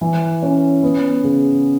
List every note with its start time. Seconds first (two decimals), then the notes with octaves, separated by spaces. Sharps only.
0.01 E3
0.42 C#4
0.83 B3
1.24 C#3